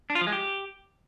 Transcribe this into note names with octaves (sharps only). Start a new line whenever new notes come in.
D4
F4
F3
G#3
G4